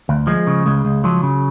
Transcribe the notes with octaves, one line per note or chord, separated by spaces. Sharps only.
D2
F3 G#3
C#3
C#2 G#3
C#2
F3 F#3
C#3